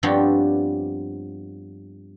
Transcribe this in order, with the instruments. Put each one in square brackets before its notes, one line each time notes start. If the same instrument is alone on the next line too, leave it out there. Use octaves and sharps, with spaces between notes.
[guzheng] G2 F3 B3 C4 D4 C#5